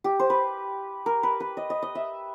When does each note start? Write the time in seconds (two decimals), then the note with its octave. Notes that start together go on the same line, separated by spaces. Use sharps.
0.04 G4
0.19 C5
0.30 B4
1.06 A#4
1.23 B4
1.40 B4
1.57 D#5
1.70 D#5
1.82 D#5
1.95 E5